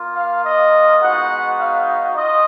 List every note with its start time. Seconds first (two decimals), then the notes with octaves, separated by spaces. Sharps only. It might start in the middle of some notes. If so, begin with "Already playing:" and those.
Already playing: A#3 F4
0.15 F5
0.44 D#5
1.01 G#3 B3 D#4 F#4 F#5
1.59 F5
2.16 F4 D#5